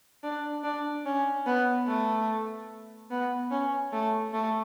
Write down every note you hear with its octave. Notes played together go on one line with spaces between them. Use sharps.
D4
D4
C#4
B3
A3
B3
C#4
A3
A3